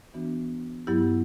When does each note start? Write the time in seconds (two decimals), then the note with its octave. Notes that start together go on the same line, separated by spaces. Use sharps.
0.14 E3 B3 D4 F#4
0.87 G2 F#3 B3 E4 G4